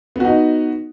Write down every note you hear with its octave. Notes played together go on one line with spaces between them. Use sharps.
B3 D#4 F#4